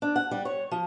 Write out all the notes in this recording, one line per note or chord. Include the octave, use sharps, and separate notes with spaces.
D4
F#5
G3
C#5
F3